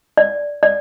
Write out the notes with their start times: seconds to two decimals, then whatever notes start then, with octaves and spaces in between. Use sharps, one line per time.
0.17 D5
0.63 D5